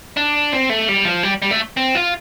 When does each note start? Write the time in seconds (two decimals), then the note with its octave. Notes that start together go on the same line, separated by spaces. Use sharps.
0.17 D4
0.52 C4
0.70 A3
0.88 G3
1.05 F3
1.23 G3
1.42 G3
1.51 A3
1.77 C4
1.95 F4